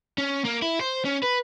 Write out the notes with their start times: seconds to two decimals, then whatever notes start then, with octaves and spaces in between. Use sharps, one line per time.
0.18 C#4
0.45 A#3
0.62 E4
0.81 C5
1.05 C#4
1.23 B4